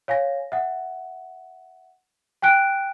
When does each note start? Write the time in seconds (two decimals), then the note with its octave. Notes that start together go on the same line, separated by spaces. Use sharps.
0.08 C#5 F5 G#5 A#6
0.52 E5 F#5
2.42 G5 G#5 F#6 D7